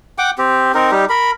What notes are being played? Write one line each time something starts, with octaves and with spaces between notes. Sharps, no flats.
F#5 G5 D6
C4 G4
C4 D#4 A#4
G3 D#4 G4
A#4 B5